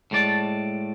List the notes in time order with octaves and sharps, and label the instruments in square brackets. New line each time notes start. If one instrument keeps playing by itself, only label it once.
[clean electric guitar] A2 G#3 D5 A5